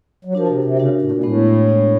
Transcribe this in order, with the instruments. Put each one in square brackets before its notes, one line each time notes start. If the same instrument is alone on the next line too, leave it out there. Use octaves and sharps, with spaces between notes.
[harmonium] F#3
[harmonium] F3 [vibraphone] D4 F#4 A#4
[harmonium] C3
C3
[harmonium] C#3 [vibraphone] D4 F#4 A#4
[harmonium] A2
A#2
[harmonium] A2 [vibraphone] G#3 B3 D4
[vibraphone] G#3 B3 D4